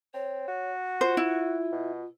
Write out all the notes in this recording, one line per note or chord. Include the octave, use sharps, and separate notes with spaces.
C4 C#5
F#4
F4 C5
E4
B2